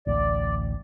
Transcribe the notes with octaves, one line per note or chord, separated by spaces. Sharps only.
A1 D2 A3 D5